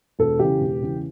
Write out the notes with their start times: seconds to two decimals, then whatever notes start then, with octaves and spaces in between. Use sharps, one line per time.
0.19 E1 A4
0.39 E2 C#3 G4
0.60 E1
0.82 E2 C#3